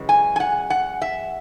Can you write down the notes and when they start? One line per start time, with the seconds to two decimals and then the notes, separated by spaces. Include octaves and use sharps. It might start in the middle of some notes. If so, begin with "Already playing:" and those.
Already playing: F#2 C#3 E3 G#3
0.09 G#5
0.36 G#5
0.40 F#5
0.70 F#5
1.02 E5